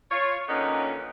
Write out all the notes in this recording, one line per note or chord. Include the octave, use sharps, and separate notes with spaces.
F4 C#5
A#2 D3 D#3 B3 C#4 D#4